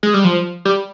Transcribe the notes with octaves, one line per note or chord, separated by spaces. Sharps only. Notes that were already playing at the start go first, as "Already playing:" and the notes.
G#3
G3
F3
G3